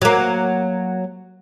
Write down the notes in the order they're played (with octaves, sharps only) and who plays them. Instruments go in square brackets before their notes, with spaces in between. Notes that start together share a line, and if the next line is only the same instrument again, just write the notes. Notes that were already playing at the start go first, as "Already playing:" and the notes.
[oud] F#3 A#3